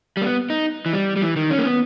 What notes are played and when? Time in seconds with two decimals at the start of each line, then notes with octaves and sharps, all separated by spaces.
0.17 G3 A#3
0.26 B3
0.50 D#4
0.86 E3
0.93 G3
1.17 G3
1.22 E3
1.36 D#3
1.51 C#4
1.58 A#3
1.65 B3